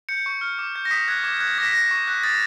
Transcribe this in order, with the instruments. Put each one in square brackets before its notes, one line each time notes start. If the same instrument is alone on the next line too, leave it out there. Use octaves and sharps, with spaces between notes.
[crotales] G6 C#7
C#6
F6
D6
G6
A#6
D#6 B6
F#6 G#6
D6 G#6
F#6 G#6
D6 A#6
B6
F#6 A#6
C#6
F#6
D#6 A6